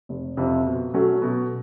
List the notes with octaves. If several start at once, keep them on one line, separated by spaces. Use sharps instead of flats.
F1
F2 C3
B2
F#3 A3 C#4 F#4
B2